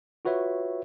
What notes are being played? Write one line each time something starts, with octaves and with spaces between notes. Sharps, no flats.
F4 F#4 B4 C#5 E5